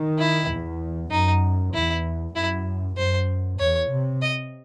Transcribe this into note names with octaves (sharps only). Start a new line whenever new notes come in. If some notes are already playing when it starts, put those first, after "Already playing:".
Already playing: D#3
E4
E2
F#2 D#4
E2 E4
F#2 E4
F#2 C5
E2 C#5
C3
D#5